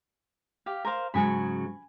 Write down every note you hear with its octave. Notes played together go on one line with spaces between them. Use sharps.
G4 F5
A#4 C5 F5
G#2 C#3 F#3 G#5 B5